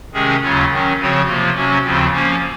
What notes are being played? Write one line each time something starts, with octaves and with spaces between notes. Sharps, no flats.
C3 D#3 G#3 C#4 G#4
D#2 C#3 F#3 C#4 F4
D#3 F#3 C#4
C#3 F3 C4 F#4 C#5
C3 F3 A#3 F4
C3 F#3 C#4 F#4
D#2 C#3 F3 C4 F4
F3 A#3 C#4